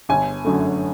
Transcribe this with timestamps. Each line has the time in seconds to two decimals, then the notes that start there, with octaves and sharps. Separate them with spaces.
0.09 G1 G#5
0.45 F#2 D3 F#3 A3